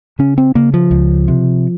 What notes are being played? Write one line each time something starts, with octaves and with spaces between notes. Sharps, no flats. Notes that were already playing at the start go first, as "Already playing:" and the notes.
C#3 C#4
C4
C#3 A#3
F3
C#2
C3